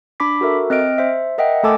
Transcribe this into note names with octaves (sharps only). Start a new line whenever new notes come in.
D4 B5 D6 B6
F#4 A4 A#4 E5
C4 D#5 F6 D7
C5 E5
A#4 D#5 E5 F#5 G5
A3 A4 G#5 A5 D6 E6